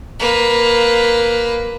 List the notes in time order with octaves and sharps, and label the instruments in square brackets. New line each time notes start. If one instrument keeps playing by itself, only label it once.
[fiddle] A#3 B4